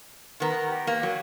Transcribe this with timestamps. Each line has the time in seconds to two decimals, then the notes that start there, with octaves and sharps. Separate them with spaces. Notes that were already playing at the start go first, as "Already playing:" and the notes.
0.40 D#3 B3 A#4
0.67 G4
0.87 A#3
1.03 F#3